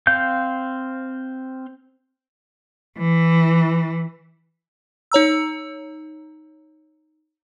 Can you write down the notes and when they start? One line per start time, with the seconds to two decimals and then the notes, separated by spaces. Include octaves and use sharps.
0.07 C4 F5 G6
2.98 E3
5.12 D#4 C#5 A#5 E6